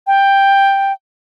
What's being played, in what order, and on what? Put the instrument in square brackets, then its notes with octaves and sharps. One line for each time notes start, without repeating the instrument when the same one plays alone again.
[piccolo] G5